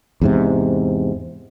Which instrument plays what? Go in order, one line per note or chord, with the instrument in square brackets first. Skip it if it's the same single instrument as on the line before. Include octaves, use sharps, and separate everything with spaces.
[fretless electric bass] E2 G#2 C3